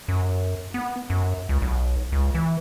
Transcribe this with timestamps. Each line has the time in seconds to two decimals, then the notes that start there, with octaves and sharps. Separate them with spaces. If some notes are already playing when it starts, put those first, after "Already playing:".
0.08 F#2
0.74 B3
1.10 F#2
1.49 C#2
1.62 B1
2.12 C#2
2.35 E3